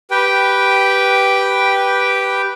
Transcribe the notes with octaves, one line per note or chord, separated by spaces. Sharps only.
G4 B4 G5